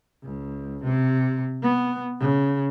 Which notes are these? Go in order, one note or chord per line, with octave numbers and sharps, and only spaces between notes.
C#2
C3
B3
C#3